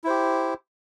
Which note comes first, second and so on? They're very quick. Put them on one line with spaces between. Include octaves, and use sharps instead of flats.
E4 C5 G4